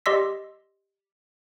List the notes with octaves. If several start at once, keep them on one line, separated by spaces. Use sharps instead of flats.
G4 D5 D#5 C6 E6 B6